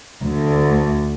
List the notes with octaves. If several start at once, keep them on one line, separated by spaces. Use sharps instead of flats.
D2